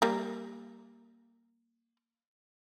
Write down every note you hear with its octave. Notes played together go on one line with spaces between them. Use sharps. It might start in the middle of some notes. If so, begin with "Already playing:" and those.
G3 A#3